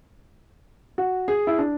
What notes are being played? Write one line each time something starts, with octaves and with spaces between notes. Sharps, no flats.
F#4
G#4
E4
D4